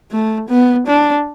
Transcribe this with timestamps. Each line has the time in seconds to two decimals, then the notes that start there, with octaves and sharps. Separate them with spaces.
0.11 A3
0.49 B3
0.87 D4